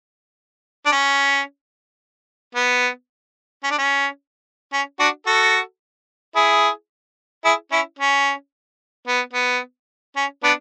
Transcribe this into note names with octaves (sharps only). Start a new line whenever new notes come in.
D4
C#4
B3
C#4
D4
C#4
C#4
D4 F#4
F#4 A4
E4 G#4
E4 G#4
C#4 E4
C#4
B3
B3
C#4
B3 D4